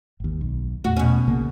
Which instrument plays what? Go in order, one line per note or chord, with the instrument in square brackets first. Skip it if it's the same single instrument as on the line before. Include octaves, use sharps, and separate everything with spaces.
[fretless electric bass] G#1 D#2
B1
[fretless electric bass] E2 A#2 A3 [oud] F#4
[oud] B2 C#4
[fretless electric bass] A#1 C#3 A#3